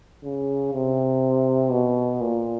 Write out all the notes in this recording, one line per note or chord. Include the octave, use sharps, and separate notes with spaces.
C#3
C3
B2
A#2